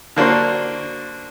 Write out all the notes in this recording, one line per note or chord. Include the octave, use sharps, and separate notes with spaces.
D3 A#3 D4 F#4 C5